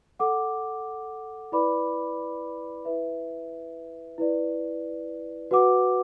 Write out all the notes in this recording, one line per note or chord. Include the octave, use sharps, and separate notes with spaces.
A4 F#5 D6
E4 B4 D5 B5 D6
E4 B4 E5
E4 B4 D5
F#4 B4 F#5 D6